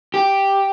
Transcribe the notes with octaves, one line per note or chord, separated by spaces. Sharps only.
G4